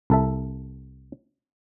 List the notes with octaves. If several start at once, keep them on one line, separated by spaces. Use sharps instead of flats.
C2 A4 E5